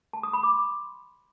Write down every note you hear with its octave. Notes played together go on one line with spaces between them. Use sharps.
A5
D#6
B5
D6
C6